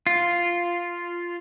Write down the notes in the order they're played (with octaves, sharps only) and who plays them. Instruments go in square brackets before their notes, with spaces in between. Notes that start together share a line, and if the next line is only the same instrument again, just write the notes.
[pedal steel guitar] F4